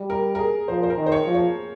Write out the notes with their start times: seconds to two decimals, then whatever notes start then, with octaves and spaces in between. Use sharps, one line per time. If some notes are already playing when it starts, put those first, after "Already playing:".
Already playing: G3
0.10 A#4
0.35 A#4
0.39 G#4
0.68 F3 C5
0.83 C5
0.90 A#4
0.97 D#3
1.06 C5
1.12 C#5
1.27 F3
1.34 C#5